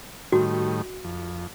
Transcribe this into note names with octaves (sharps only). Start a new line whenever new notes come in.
A2 D#3 G3 F#4
F2